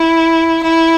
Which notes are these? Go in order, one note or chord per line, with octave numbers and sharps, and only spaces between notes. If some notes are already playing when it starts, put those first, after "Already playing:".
Already playing: E4
E4